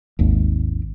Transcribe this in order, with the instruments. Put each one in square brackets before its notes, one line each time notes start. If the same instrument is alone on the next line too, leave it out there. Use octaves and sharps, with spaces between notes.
[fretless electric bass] G#1 D#2